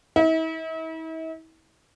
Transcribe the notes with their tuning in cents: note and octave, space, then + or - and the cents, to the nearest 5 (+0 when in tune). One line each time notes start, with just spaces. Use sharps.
E4 -45